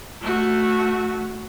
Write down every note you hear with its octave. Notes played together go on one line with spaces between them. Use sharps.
A3 F#4